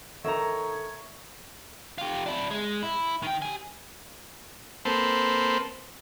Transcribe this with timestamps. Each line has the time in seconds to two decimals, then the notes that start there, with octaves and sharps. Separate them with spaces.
0.24 D#3 D#4 A4 C#5 E5 A#5
1.98 F4 G4
2.26 D4 E4
2.51 G#3
2.83 E4
3.23 D#3 G5
3.42 G4 G#5
4.85 A#3 C4 A4 B4 C5